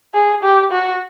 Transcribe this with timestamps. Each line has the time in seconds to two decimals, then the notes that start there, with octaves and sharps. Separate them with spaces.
0.14 G#4
0.43 G4
0.72 F#4